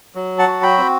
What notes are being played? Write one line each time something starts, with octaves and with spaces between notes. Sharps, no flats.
F#3
F#5 A5
F#4
G5 B5
C4